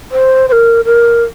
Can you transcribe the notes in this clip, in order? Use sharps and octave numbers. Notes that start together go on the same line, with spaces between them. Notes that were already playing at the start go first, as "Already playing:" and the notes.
C5
C5
A#4
A#4